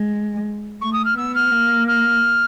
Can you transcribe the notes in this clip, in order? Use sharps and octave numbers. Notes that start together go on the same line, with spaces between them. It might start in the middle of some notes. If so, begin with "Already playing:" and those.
Already playing: G#3
A3 C#6
D#6
F6
B3 E6
F6
A#3
F6